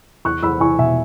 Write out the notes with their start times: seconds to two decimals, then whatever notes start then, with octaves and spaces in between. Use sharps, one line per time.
0.25 E2 C#6 F#6
0.43 E2 B5 E6
0.60 E2 G#5 C#6
0.78 B2 E5 G#5